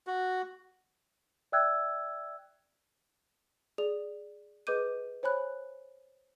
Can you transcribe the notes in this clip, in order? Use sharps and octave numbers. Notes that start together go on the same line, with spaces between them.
F#4
D5 E5 G5 E6 F#6 G#6
G#4 D5 F7
G#4 B4 D#5 D6 G6 D#7
C5 C#5 G#5 B5 F#6